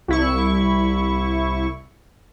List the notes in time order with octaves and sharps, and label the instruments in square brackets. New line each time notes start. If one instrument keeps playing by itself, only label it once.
[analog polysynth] C2 E4 C#6